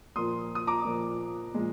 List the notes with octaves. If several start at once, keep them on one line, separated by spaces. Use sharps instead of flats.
A#2 F3 A#3 C6 D#6
D#6
A#5 D6
A#2 F3 A#3
A#2 F3 G#3